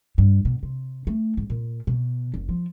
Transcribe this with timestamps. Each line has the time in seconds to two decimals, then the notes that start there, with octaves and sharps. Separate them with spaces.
0.18 G2
0.45 B2
0.63 C3
1.07 A3
1.37 G#2
1.50 A#2
1.87 B2
2.34 F#1
2.49 F3